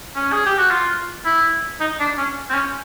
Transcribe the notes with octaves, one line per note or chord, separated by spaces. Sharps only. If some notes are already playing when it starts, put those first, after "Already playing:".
C#4
G#4
G4
F#4
F4
E4
D#4
D4
C#4
C4
C#4